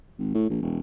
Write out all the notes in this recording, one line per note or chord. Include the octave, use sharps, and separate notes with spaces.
G#1
A2
A#1
E1